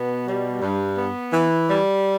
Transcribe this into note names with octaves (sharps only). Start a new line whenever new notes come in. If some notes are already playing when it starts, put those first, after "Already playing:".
Already playing: B2 B3
G3
G2
B3
E3
G3